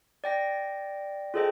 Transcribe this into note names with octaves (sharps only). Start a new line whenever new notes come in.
D5 G5 A#6
F4 G#4 A4 C5 D#5 G5